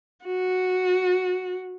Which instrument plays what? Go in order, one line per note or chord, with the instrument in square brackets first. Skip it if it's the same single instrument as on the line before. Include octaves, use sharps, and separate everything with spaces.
[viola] F#4